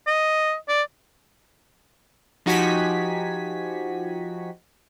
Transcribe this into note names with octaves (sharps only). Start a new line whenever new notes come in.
D#5
D5
F3 D#4 F#4 G4 G#5 B6